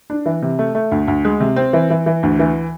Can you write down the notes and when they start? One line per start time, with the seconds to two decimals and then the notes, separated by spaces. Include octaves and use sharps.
0.10 D4
0.26 E3
0.42 C3
0.59 A3
0.75 A3
0.92 D2
1.08 D2
1.25 G#3
1.40 C3
1.56 C4
1.73 E3
1.90 E3
2.06 E3
2.23 D2
2.39 E3